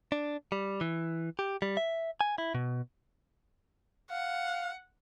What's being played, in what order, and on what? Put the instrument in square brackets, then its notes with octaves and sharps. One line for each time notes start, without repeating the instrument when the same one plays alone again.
[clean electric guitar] D4
G3
E3
G4
G3
E5
G#5
E4
B2
[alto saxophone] F5 [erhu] F#5